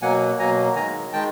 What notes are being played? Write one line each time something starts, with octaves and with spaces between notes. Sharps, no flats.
B2 F#3 A#3 F#5 G#5
B2 F#3 A#3 G#5 A#5
D#3 G#3 G#5 A#5
D#3 G#3 G5 A5